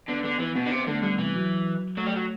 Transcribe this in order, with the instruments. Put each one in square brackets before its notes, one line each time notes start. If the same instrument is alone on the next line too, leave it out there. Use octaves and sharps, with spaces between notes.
[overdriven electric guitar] D3 [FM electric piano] B3
[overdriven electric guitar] D3 [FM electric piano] B3
[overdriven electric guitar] E3 [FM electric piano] B3
[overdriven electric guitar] B2 [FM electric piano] B3
[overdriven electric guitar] D3
[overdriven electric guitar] C3 [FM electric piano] B3
[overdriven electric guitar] D3 [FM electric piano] A3
[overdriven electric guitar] D3 [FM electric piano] G3
[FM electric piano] C3 [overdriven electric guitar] E3
[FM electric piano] F#3
[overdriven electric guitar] F#3 [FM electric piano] A3
[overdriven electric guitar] G3
F#3